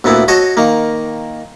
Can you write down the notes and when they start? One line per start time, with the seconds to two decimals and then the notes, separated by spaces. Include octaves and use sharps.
0.04 D2 A#2 B3 E4
0.28 F#4 C#5 D#5 A5
0.57 D#3 A#3